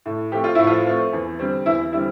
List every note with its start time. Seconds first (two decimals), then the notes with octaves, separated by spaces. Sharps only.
0.06 A2
0.32 F3 A3 C4 G4
0.44 F4
0.55 A2 E4
0.67 F3 F4
0.86 F3 A3 C4
1.13 E2
1.39 D3 G3 C4
1.66 E2 E4
1.92 D3 G3 C4 E4